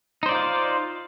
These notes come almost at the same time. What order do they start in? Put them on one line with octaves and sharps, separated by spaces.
D#4 C5 D5 F4 F5